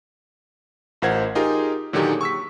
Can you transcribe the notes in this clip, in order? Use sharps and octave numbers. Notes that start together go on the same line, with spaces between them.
A1 F4 A#4 C5 F#5 G#6
D#4 F4 G4 G#4 A#4
A#2 D3 D#3 F#3 G4 G#4
C#6 E6 B6